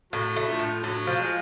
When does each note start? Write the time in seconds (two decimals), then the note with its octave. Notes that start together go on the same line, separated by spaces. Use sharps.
0.13 A2 F#3
0.36 A3
0.48 D3 F3
0.59 A2
0.83 A2 D3 F#3
1.07 F3
1.19 G#3